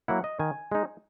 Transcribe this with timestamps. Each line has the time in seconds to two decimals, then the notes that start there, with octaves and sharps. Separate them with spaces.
0.08 F#3 A#3 E4 F#5
0.24 D#5
0.39 D#3 G#5
0.72 G#3 D#4